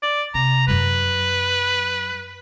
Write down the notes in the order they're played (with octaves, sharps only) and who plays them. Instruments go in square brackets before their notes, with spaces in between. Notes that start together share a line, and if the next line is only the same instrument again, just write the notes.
[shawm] D5
[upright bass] C3 [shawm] A#5
[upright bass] F#2 F#3 [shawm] B4